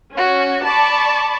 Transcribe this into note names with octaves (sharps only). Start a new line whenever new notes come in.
C#4 F#4
D5 A5 B5 C#6 D6